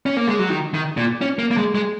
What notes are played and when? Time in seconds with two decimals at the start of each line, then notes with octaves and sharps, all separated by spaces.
0.06 C#4
0.17 A#3
0.28 G#3
0.39 F#3
0.50 D#3
0.74 D#3
0.97 A#2
1.21 C#4
1.39 A#3
1.51 A#3
1.57 G#3
1.75 G#3